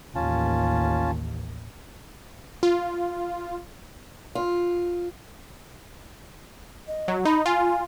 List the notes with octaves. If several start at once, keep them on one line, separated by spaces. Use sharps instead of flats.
A1 D#2 C#4 F4 A5
F4
F4
D#5
F#3
D#4 B5
F4 G#5